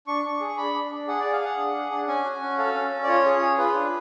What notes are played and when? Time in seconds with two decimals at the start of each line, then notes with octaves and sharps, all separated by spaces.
0.07 D4 C#6
0.25 D4
0.33 C#6
0.40 G#4
0.57 D4 B5
0.74 D4
0.91 D4
1.07 G#4 F#5
1.20 G#4 D5
1.33 F5
1.41 G#4 F#5
1.57 D4
1.75 G#4
1.91 D4
2.08 C#4 G#5
2.24 F#4
2.42 C#4
2.58 A4 F5
2.74 C#4
2.91 C#4
3.04 D5
3.08 F4 C#5
3.25 G#4
3.42 G#4
3.58 F4 B4
3.74 D4